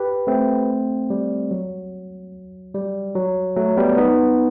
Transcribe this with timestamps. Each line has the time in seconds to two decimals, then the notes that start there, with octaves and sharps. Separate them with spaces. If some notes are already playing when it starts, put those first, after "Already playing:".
Already playing: G4 B4
0.27 A3 C4
1.10 G3
1.51 F#3
2.74 G3
3.15 F#3
3.56 F#3 A3
3.77 G3 B3
3.97 B3 D#4